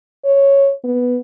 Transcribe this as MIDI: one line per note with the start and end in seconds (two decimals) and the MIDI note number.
0.25 0.71 73
0.84 1.19 59